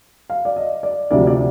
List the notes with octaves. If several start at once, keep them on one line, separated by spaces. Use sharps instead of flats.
F5
D5
D#5
D5
D2 C3 F3 D5
D5